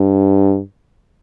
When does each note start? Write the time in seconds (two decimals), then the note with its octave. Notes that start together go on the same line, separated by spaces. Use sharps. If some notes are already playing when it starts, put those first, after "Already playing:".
Already playing: G2